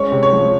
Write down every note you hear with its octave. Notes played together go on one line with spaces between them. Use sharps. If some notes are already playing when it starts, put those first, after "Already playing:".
Already playing: G#3 C#4 C#5
C3
C#5
F3